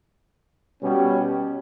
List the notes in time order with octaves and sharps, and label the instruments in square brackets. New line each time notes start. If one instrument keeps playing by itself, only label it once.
[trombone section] B2 G3 C#4 G4